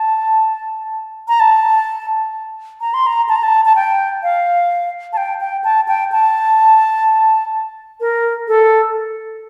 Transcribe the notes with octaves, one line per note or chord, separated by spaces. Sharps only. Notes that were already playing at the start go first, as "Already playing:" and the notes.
Already playing: A5
A#5
A5
A#5
C6
A#5
A5
A#5
A5
A5
G5
F5
A5
G5
G5
A5
G5
A5
A#4
A4